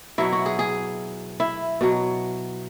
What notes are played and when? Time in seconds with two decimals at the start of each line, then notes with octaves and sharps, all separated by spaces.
0.18 B2 F#3 E4
0.33 F#4
0.46 G#4
0.59 G#4
1.40 E4
1.81 B2 F#3